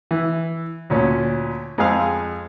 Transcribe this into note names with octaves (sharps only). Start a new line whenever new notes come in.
E3
D2 A#2 C#4
F2 G#3 G#4 F5 F6